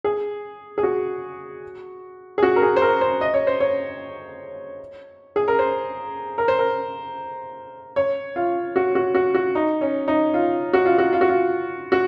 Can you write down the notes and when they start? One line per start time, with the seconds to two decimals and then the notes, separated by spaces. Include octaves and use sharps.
0.04 G#4
0.78 G#4
0.83 F#4
2.38 G#4
2.43 F#4
2.56 A#4
2.62 G#4
2.76 C5
2.82 A#4
3.01 C5
3.21 D#5
3.34 C#5
3.47 C5
3.60 C#5
5.36 G#4
5.48 A#4
5.59 C5
6.38 A#4
6.48 C5
6.59 A#4
7.96 C#5
8.36 F4
8.76 F#4
8.95 F#4
9.15 F#4
9.35 F#4
9.55 D#4
9.81 C#4
10.08 D#4
10.34 F4
10.73 F#4
10.86 F4
10.98 F#4
11.13 F4
11.21 F#4
11.29 F4
11.92 F#4